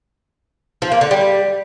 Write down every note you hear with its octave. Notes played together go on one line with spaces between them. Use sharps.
F3
A#3
D3
G3